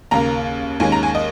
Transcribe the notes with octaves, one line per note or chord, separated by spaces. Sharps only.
D#2 C#3 A#3 A#5
D#2 D#3 G#3 C#4 G#5
A#5
G#5
D#5